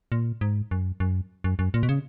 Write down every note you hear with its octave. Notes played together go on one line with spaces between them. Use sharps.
A#2
G#2
F#2
F#2
F#2
F#2
A#2
B2
C#3